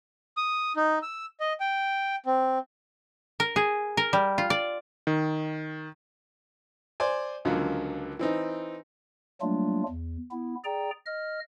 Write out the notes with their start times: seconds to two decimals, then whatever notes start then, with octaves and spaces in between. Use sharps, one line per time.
0.37 D#6
0.76 D#4
1.02 E6
1.40 D#5
1.60 G5
2.26 C4
3.40 A#4
3.56 G#4
3.97 A#4
4.13 G3
4.38 F4
4.50 D5
5.07 D#3
7.00 C5 D5 G#5
7.45 C#2 D3 F3 F#3 A#3
8.19 E3 C4 D#4
9.41 F#3 G3 A3 A#3 D4 F4
9.89 E2
10.31 B3 E4
10.65 G#4 D5 G5 A#5
11.06 D#5 F6